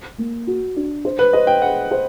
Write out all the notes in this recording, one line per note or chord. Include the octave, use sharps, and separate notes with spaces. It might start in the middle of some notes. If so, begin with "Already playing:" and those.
A#3
F#4
D4
C5
B4
C5 D#5
G5
G#4 F#5
C5